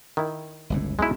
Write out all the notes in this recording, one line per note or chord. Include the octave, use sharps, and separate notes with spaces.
D#3 E4
G1 C#2 A2
B1 G#3 E4